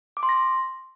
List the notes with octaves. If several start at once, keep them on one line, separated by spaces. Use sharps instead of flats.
D6
C6
A#6